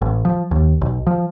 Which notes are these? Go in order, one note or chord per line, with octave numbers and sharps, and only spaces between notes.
A1
F3
D#2
B1
F3